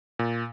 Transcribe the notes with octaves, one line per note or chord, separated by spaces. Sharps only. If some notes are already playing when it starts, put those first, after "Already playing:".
A#2